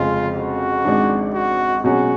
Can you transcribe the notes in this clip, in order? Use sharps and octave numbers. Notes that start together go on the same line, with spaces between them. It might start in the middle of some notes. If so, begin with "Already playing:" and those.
Already playing: F1 F2 C#3 G#3 C#4 F4
F#4
G#1 G#2 G#3 D4
F#4
B2 F#3 C#4 F#4 G#4